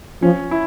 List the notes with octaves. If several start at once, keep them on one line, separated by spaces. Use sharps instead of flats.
F3 C#4
E4